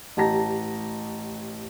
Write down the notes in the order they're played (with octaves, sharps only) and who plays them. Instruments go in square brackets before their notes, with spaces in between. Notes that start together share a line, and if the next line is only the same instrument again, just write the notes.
[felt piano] A1 G4 A5 A#5 A#6